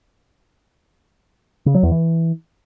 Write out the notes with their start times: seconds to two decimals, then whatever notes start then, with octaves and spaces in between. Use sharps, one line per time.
1.66 C#3
1.75 F#3
1.83 E2
1.91 E3